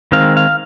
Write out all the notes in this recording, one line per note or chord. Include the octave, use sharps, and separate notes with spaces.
D#3 G#3 C4 F5
F5